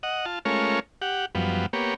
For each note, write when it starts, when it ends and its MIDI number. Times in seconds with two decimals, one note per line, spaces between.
0.03 0.25 75
0.03 0.25 78
0.25 0.39 65
0.25 0.39 81
0.45 0.80 56
0.45 0.80 57
0.45 0.80 61
0.45 0.80 65
0.45 0.80 70
0.45 0.80 73
1.02 1.26 67
1.02 1.26 78
1.35 1.66 42
1.35 1.66 53
1.35 1.66 55
1.35 1.66 59
1.73 1.94 58
1.73 1.94 59
1.73 1.94 67
1.73 1.94 73